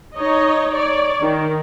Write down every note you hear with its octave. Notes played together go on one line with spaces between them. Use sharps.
D#4 C#5 D#5
C#5 D5
D#3